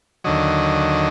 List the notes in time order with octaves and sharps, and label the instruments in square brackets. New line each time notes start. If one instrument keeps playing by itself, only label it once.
[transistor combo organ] D#2 D3 F#3 D#5